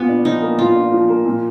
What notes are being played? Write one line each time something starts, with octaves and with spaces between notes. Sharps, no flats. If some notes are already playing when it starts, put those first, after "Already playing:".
Already playing: A#2 B3
D4
F3 D#4
A#3
A#2 F4
D4
F3
A#3
A#2